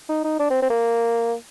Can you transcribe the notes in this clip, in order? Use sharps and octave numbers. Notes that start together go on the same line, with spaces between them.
D#4
D#4
D4
C4
C4
A#3